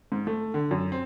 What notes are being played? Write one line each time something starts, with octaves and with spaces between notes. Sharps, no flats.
G#2
A3
D3
F#2
C4